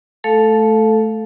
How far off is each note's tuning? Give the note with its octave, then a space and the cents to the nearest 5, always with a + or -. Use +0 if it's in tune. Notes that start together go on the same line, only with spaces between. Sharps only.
A3 -15 A4 +0 F5 +0